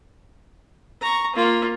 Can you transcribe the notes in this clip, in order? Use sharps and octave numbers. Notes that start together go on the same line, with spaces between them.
A#5 C#6
A#3 F4